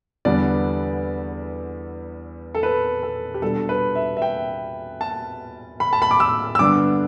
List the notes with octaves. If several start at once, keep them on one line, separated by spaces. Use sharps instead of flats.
E2 D3 G3 B3 D4 D5
A4
B4
A4
G4
B2 G3 D4 A4
B4
E5
E5
G5
A5
B5
A5
B5
D6
E6
E6
G2 D3 B3 D4 D6